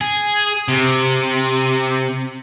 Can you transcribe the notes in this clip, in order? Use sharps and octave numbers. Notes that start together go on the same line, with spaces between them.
G#4
C3